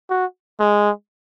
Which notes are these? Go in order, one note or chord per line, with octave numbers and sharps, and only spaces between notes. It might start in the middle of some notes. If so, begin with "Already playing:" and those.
F#4
G#3